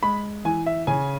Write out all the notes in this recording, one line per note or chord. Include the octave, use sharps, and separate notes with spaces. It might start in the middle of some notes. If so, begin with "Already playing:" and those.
G#3 B5
E3 G#5
E5
C#3 G#5